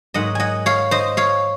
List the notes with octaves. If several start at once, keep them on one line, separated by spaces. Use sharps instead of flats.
G#2 F#3 A#3 D#5 F#5
D#5 F#5 G#5
C#5 F5
C5 D#5
C#5 F5